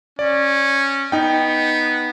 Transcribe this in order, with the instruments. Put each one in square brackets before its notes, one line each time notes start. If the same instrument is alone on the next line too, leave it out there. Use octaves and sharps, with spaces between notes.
[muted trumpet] C#4 [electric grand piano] D5
[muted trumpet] B3 [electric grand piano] D#4 G5